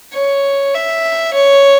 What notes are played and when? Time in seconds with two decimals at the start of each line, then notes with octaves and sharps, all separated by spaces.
0.14 C#5
0.74 E5
1.34 C#5